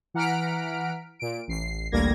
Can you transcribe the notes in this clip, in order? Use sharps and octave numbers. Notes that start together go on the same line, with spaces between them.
E3 F#5 A#5 F6 B6 D7
A#2 D7
A1 C7
A1 D2 G3 A#3 G#6 A#6